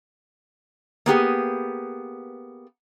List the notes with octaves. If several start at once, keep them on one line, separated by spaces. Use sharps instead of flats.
A#3 B3 G4 G#4